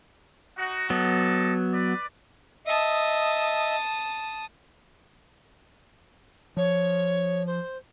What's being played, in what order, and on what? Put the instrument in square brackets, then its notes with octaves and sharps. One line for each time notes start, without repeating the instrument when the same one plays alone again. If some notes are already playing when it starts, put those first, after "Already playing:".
[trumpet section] D#4 F#4
[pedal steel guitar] F#3 B3 [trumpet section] G4 A4 D#5
[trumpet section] B4 D5
[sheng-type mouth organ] D#5 E5 [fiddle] A5 D#6
[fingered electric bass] F3 [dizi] C#5
[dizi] C5